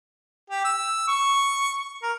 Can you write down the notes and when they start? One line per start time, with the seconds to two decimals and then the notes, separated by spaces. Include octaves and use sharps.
0.50 G4
0.65 E6
1.08 C#6
2.02 A#4